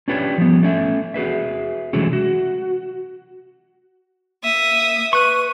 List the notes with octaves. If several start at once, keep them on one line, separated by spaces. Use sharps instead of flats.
C#4 D4 F4 G4 B4 C#5
F3 G3 B3
A3 C#4 E5
F#4 G#4 B4 E5
C3 E3 F#3 G#3 A3 C#4
F#4
A#3 E5 D#6
B4 C#6 F#6 D#7